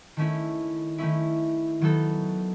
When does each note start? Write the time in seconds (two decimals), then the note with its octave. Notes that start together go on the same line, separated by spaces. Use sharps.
0.17 D#3 A3 C#4 E4
0.98 D#3 A3 C#4 E4
1.81 D#3 F#3 B3 D#4 A4